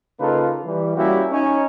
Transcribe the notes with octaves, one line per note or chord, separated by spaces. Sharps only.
C#3 A#3 D#4 F4 A4 B4
E3 G3
G3 A#3 C#4 E4 F#4 G4
C#4 D#4